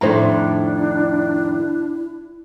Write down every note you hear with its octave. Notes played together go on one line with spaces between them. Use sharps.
F2 A2 D#3 D4 E4 A4 C5 A#5